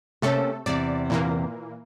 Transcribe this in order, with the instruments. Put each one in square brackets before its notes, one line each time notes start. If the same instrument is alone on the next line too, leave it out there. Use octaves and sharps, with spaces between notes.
[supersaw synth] C3 A3 A4 [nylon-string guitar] A#3 C#4
[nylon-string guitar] E2 C3 [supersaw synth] D5
[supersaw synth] A#2 E3 A#3